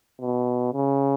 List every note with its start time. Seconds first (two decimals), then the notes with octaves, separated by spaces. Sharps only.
0.21 B2
0.73 C#3